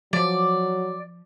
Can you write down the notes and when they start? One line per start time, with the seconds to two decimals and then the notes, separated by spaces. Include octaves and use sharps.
0.13 F3 F#3 D5